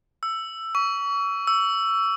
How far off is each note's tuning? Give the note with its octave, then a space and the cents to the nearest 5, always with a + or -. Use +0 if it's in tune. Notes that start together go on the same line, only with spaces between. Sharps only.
E6 +10
C#6 +35
E6 +10